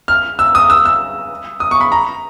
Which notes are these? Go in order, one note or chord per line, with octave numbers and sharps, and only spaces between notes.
F6
E6
D#6
E6
E6
D#6
C#6
B5
A#5